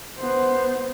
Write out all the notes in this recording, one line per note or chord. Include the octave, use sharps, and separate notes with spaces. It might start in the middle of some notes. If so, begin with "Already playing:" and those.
B3 C5